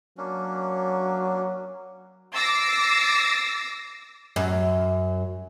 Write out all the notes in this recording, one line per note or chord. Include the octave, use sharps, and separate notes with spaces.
F#3 A#3 C#4 D4
D6 E6 A6 A#6 C7
F#2